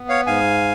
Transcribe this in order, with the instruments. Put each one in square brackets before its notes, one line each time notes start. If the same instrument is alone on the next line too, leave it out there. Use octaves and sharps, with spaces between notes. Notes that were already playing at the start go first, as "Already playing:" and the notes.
Already playing: [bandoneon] B3
C#5 F5
G#2 F5 G#5